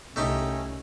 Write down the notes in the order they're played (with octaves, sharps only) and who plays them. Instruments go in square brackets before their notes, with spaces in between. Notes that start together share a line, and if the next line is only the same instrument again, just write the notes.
[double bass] C2 [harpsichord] A3 D#4 G4 [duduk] C#4